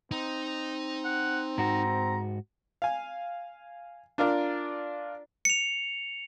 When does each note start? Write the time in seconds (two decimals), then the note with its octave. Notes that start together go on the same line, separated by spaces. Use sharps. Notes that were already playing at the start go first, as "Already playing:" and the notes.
0.11 C4 D#4
1.05 F#5
1.58 G#2 F#4 A#5
2.82 F5 G#5
4.18 D4 F4 A#4 D5
5.45 C#7 F7